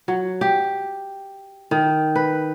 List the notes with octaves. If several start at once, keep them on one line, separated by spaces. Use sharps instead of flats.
F#3
G4
D#3
B4